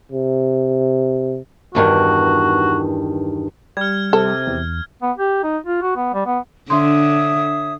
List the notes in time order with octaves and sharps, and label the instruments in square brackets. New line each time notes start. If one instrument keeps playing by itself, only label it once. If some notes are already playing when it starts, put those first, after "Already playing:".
[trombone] C3
[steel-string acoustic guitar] E2 G2 D#3 [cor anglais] F#4
[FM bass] G3 [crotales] F6 G#6
[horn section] C3 [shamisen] A4
[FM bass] E2
[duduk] B3
G4
D#4
F4
F#4
B3
G3
B3
[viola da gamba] D3 [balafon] D4 C6 [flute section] C#5 E5 D#6